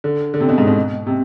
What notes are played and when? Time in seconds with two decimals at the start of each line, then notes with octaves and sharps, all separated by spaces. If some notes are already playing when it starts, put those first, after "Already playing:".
0.04 D3
0.34 D3
0.40 C3
0.49 B2
0.58 G#2
0.67 B2
1.07 C3